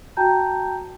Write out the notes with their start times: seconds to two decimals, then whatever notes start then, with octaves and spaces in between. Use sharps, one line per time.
0.17 F#4 G5 A5 A#5 G6